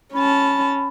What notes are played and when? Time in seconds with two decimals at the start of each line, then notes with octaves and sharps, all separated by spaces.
0.14 C#4 A5 B5